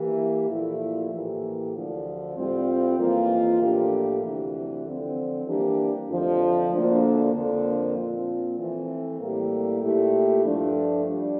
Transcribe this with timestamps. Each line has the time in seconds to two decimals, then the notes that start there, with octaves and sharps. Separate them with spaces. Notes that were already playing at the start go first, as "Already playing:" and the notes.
Already playing: E3 A#3 E4 G4
0.50 A#2 F3 A3 E4
1.12 A2 E3 A#3 E4 G4
1.75 D2 D3 F3
2.37 A2 G3 C4 F4
2.99 F2 E3 A#3 F4
3.62 A2 F3 A#3 D4 G4
4.23 D2 C3 E3
4.86 D3 F3 C4
5.47 E3 G3 A#3 D4 G4
6.09 F2 D3 F3 A3
6.72 D2 D3 F3 A#3 D4
7.34 F2 D3 F3 A#3
7.97 A#2 F3 C4 F4
8.58 E3 A3 C4
9.20 A2 G3 A#3 E4 G4
9.82 A#2 A3 E4 G4
10.45 G2 F3 A3 D4
11.07 G3 D4